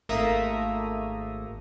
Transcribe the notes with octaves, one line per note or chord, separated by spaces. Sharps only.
G#1 A3 A#3 E5 A#5 D#6